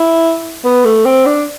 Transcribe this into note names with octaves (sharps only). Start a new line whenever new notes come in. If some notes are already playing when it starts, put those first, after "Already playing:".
Already playing: E4
B3
A3
C4
D4